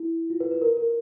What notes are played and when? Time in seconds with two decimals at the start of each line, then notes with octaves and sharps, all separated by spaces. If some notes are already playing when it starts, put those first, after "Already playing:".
Already playing: E4
0.30 F4
0.40 B4
0.51 B4
0.62 A#4
0.77 A#4